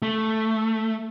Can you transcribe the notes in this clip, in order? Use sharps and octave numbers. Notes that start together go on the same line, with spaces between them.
A3